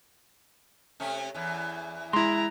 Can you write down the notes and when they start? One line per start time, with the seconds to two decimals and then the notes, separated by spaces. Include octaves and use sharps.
1.00 C3 A3 C#4
1.34 E2 E3
2.13 G#3 E4 A#5 C6